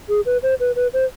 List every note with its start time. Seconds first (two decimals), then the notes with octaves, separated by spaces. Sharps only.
0.09 G#4
0.26 B4
0.43 C5
0.60 B4
0.76 B4
0.93 C5